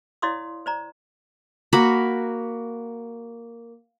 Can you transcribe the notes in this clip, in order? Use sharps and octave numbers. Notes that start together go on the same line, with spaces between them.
E4 C#5 D5 F5 C6 D#6
C5 D5 A#5
A#3 F#4 A#4 B5